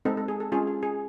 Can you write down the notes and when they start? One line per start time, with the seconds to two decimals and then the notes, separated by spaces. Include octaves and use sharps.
0.05 G#3 C4 D#4 A4
0.17 A4
0.28 G#4
0.40 A4
0.52 G#3 C#4 F4 G#4
0.67 G#4
0.83 G#4